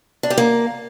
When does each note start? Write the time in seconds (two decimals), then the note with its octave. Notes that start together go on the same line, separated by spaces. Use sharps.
0.23 D4
0.30 G4
0.38 A#3